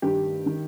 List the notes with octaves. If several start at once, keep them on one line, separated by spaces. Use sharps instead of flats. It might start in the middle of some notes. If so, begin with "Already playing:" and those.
G2 D#3 G4
D#3